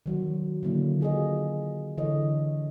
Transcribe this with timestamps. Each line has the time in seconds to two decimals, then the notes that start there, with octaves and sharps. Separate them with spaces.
0.06 D#3 F#3 F#4
0.63 D3 F3 F#3 A#3 E4
1.00 F4 F#4 G#4 A4 D#5
1.97 D3 E3 A4 C#5 D#5